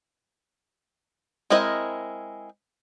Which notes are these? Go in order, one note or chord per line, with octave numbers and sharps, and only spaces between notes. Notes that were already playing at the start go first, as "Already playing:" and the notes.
G#3 C4 E4 A#4 D#5